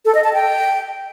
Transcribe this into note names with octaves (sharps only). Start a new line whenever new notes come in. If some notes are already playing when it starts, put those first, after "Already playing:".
A4
D#5
A5
G5